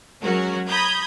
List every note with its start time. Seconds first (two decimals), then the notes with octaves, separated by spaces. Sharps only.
0.22 F#3 G#3 C#4 F#4 A#4
0.67 A#5 B5 D#6 G6 G#6